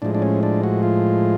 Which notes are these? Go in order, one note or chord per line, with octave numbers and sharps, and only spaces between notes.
A2 F3 G#3 D4
D4
C#4
D4
F#4
F4